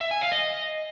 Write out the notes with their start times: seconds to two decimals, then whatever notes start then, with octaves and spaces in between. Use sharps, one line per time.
0.01 E5
0.11 G#5
0.21 F5
0.32 D#5